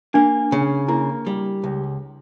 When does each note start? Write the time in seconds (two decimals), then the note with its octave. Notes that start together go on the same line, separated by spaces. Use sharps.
0.14 A#3 D4
0.52 C#3
0.88 A#3 E4
1.27 G3
1.64 C#2